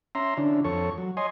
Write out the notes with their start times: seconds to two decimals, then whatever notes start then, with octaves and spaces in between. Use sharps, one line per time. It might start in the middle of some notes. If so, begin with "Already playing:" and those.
0.15 C#4 E5 A#5 C6
0.37 D3 C#4 D4 E4
0.65 F2 A4 C#5 C#6
0.98 F#3
1.17 C#5 D#5 G#5 C6